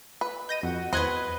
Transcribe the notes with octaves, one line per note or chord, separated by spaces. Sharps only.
B4
D#5 G6 A#6 D#7
F2 F#4
E2 B4 C5 D#5 F#6 G#6